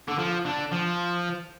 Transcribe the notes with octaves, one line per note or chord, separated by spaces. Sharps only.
D3
F3
D3
F3